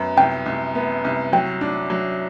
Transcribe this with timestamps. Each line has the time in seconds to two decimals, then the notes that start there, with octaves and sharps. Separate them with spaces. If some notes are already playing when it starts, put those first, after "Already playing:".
Already playing: F#2 B3
0.17 C2 G5
0.46 C2
0.75 B3
1.05 C2
1.33 F#3 G5
1.61 D4
1.90 F#3